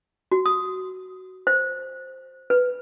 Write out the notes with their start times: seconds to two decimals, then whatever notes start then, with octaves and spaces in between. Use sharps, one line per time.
0.32 F#4
0.46 D#6
1.47 C5
2.50 B4